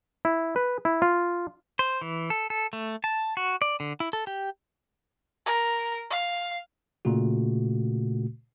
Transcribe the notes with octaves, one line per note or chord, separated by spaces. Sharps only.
E4
B4
E4
F4
C5
E3
A4
A4
A3
A5
F#4
D5
D3
E4
A4
G4
A#4
F5
A#2 C#3 A3 F#4